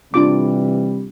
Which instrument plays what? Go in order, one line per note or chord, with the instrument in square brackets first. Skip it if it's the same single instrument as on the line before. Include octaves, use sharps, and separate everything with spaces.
[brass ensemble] C3 E3 G3 [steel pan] D4 F4 D6